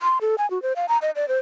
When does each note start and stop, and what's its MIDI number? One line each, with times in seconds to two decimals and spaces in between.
0.02 0.18 84
0.21 0.35 69
0.38 0.49 80
0.51 0.61 66
0.62 0.73 72
0.76 0.86 77
0.89 0.98 82
1.02 1.11 75
1.16 1.28 74
1.28 1.39 72